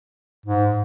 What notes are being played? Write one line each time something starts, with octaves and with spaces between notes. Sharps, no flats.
G#2